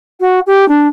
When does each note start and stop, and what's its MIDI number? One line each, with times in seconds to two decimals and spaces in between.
0.20 0.40 66
0.46 0.67 67
0.68 0.88 62